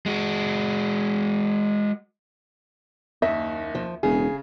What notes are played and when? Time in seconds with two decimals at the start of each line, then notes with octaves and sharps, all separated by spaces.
0.06 G#3 F#4
3.22 F#1 D#2 D#5 E5
3.75 F3
4.03 E1 C#3 G#4